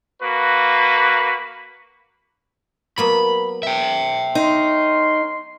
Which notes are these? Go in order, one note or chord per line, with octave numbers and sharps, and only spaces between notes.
A#3 F#4 B4
F#3 A#3 B3 B5
E5 G5
D#4 A#4 C#5 C6